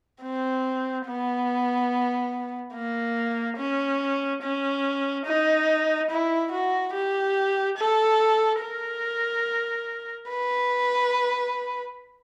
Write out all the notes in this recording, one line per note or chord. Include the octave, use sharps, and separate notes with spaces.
C4
B3
A#3
C#4
C#4
D#4
E4
F#4
G4
A4
A#4
B4